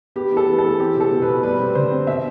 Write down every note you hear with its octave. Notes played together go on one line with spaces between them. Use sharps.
B3 G4
E3 A4
B3
A4
E3
C4 G4
B2 A4
B2
B4
B2
G3 B4
C4
D3 C5
C4
B2 E5